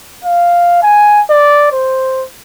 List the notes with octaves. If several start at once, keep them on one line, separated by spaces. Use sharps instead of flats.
F5
G#5
D5
C5